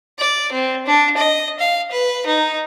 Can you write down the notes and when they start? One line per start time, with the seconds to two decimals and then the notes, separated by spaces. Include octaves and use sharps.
0.19 D5
0.52 C4
0.86 D4
1.17 D#5
1.60 F5
1.92 B4
2.27 D#4